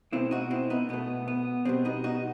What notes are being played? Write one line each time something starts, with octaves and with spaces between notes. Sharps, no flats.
B2 A3 C4 E4
D#4 F#4
C4 E4
B3 D#4
B2 A3 B3
B3
B2 G3 B3 C4
B3 D#4
D#4 F#4